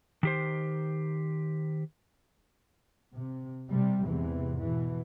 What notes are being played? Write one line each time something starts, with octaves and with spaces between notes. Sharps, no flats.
D#3 G4 C5
C3
C3 G3
E2 G#2 C3 E3
B2 E3